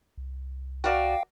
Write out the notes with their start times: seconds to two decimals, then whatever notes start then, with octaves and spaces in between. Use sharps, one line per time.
0.17 C2
0.84 F#4 A#4 D5 F5 G5